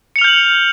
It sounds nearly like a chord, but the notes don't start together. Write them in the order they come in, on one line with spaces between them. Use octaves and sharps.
C#7 F7 F6 G6 F#7